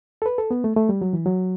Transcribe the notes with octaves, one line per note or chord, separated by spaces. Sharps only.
A4
B4
A4
B3
A3
A3
G3
F#3
E3
F#3